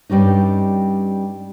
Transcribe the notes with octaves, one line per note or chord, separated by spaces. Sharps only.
G2 G3 C#4 D#4